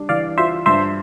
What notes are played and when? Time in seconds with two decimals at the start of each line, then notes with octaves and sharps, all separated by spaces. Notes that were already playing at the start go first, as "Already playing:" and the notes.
Already playing: G3 D4
0.09 E3 D5 F5
0.38 F4 C5 E5
0.66 G2 C5 E5